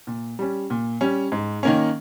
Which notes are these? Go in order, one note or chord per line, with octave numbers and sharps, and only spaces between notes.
A#2
G3 C#4
A#2
G3 C#4
G#2
D#3 A#3 C#4